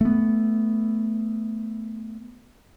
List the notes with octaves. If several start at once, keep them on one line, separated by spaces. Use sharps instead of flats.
A3 B3